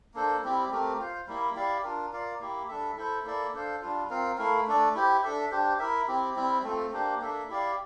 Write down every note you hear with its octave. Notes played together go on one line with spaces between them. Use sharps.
A#3 D4 A4 C5
G3 C4 E4 G4
A3 C4 G4 A#4
F4 C5 F5
G3 A#3 E4
E4 G4 D5 F5
D4 F4 A#4
F4 A#4 D5 F5
A#3 E4 G4
G3 D4 A4 E5
E4 A4 C5
A#3 E4 A4 D5
D4 A4 C5 F5
G3 D4 F4
C4 F4 A#4 F5
A3 E4 A#4 F5
A3 D4 A4 D5
E4 G4 C5
D4 A4 E5
D4 G4 C5
E4 A#4 E5
C4 E4 G4
G3 C4 E4
A3 C4 F4 A4
A#3 D4 G4 C5
A#3 D4 A4 E5
E4 G4 D5 F5